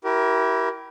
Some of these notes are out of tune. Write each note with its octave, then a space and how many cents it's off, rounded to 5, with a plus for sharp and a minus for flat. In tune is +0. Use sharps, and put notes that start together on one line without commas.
E4 -5 G4 -30 A#4 +15